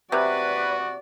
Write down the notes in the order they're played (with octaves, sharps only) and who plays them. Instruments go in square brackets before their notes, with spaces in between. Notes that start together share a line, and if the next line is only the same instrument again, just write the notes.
[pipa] C3 [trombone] F#4 [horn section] B4 [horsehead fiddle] D5